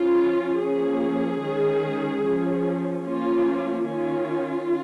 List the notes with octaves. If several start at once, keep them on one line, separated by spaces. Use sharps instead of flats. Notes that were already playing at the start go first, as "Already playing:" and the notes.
Already playing: F3 C#4 F4
F3 A#3 C#4 G#4
D#3 G#3 C#4
F3 C#4
F3 A#3 C#4 F4
D#3 C#4 F4